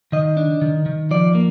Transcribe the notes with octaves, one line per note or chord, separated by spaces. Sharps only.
D#3 D#5
D4
D#3
D#3
F3 D5
A#3